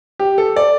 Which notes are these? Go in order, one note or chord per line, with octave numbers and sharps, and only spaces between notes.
G4
A4
D5